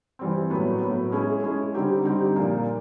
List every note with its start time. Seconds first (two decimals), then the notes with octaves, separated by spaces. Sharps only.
0.19 E3 G3 C4
0.50 A2 F#3 B3
0.81 A2 F#3 B3
1.12 G#3 C#4 E4 G#4
1.43 G#3 C#4 E4 G#4
1.74 D3 G3 C4 D#4 G4
2.05 D3 G3 C4 D#4 G4
2.36 A#2 F3 A#3 D#4